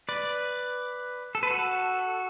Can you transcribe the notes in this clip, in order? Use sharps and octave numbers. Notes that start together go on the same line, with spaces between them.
B4 D5
A4
B4
F#4 A4